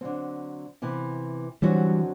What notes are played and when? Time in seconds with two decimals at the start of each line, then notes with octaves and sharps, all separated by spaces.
0.01 D3 F#3 C4
0.82 C3 E3 B3 E4
1.62 F#2 D3 E3 F#3 G3 C4 F#4